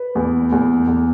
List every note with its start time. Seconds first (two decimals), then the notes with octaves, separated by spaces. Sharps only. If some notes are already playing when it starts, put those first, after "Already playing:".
Already playing: B4
0.15 E2
0.52 E2
0.87 E2